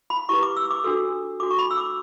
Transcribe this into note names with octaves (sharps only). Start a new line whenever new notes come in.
B5
E4 G4 B4 C#6
D6
E6
D6
D4 F#4 A4 E6
D4 F#4 A4 D6
C#6
B5
E6
D6